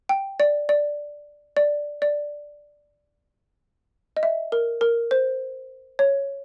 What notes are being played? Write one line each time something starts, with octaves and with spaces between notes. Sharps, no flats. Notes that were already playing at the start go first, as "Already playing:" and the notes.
G5
D5
D5
D5
D5
D#5
E5
A#4
A#4
C5
C#5